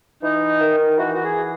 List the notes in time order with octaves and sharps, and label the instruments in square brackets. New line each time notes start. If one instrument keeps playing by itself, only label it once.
[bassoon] E3 [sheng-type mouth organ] D#4
[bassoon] D#3
[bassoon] E3 [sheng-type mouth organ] F#4
[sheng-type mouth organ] F#4
G#4